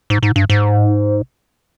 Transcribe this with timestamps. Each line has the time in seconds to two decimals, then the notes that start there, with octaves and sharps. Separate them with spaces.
0.10 G#2
0.23 G#2
0.36 G2
0.50 G#2